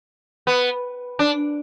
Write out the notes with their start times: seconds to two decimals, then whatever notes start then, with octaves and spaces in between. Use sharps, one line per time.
0.47 B3
1.19 D4